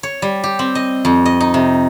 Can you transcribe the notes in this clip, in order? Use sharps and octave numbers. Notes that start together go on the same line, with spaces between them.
C#5
G3
G4
C4
D#5
F2
D#5
D#4
C3